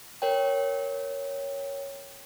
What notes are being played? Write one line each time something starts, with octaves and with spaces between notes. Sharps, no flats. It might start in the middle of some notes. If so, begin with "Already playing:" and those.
A#4 C#5 G5